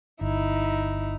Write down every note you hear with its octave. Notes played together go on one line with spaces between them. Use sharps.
G1 D#4 E4